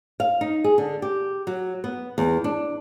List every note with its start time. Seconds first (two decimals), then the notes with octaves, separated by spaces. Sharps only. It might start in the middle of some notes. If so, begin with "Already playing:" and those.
0.20 F5
0.41 D#4
0.64 G#4
0.78 D3
1.02 G4
1.47 F#3
1.84 B3
2.18 E2
2.44 D4